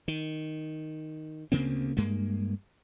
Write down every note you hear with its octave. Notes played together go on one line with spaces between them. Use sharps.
D#3
D2 C#3 A#3 C4
G2 G#3 A#3